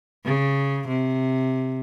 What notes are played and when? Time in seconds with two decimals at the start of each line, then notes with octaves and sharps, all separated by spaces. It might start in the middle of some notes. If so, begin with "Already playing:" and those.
0.25 C#3
0.88 C3